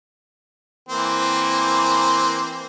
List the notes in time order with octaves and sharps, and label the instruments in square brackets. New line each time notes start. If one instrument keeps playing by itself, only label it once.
[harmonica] E3 A#3 C4